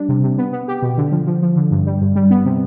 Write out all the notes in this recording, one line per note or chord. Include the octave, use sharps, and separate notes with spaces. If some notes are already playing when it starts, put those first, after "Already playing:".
Already playing: G3 D4
C3
C3
B3
B3
G4
B2
D3
F3
F3
F3
D3
G2
G3
G2
G3
B3
C3